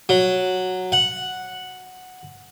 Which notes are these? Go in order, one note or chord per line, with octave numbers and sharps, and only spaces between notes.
F#3
F#5